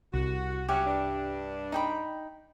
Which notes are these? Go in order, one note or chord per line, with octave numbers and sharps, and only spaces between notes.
C2 F#4
F#3 C#4 F#4 G4 E5
G2 D4
D#4 G5 B5